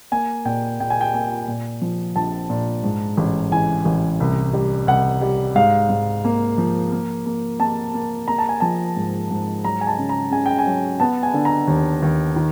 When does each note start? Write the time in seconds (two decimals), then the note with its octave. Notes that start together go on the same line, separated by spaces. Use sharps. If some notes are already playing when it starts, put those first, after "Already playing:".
0.11 A#3 G#5
0.45 A#2 G5
0.80 A#2 G5
0.90 G#5
1.01 G5
1.14 A#3 G#5
1.48 A#2
1.82 F3
2.16 A#1 A5
2.50 A#2
2.84 G#2
3.17 A1
3.51 E3 G#5
3.85 A1
4.20 C2
4.53 G3
4.87 C2 F#5
5.21 G3
5.55 G#2 F5
5.89 G#2
6.24 A#3
6.58 F3
6.92 A#3
7.26 A#3
7.60 A#3 A5
7.94 A#3
8.28 A#3 A#5
8.38 A5
8.49 G#5
8.60 F3 A5
8.96 G#2
9.31 G#2
9.65 F#3 A#5
9.81 G#5
9.87 A5
9.98 C#3
10.09 A#5
10.31 C#3 G#5
10.46 G5
10.59 G#5
10.66 F#3
11.00 B3 A5
11.23 G#5
11.34 D3
11.45 A#5
11.68 D#2
12.02 D#2
12.36 D#3